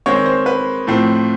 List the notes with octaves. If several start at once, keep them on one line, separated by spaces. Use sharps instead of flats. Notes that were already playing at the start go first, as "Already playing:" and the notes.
D#3 G#3 C4 C#5
C5
B4
A2 F3 A3 C4